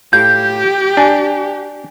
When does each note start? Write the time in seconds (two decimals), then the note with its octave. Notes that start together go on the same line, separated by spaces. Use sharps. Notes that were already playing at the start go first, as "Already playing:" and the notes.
0.13 A2 G4 F5 G6
0.97 D4 G#5